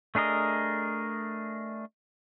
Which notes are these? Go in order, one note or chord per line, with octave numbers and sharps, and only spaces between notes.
A3 D4 G#4 A#4 D#5